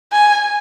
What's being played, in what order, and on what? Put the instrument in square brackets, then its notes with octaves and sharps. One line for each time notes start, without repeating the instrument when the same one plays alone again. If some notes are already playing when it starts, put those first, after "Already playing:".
[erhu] G#5